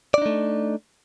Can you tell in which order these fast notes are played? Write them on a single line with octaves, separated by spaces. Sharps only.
D5 D4 D#4 A3